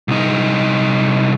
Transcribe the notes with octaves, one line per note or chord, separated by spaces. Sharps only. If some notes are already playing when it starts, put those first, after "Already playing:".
C2 D#4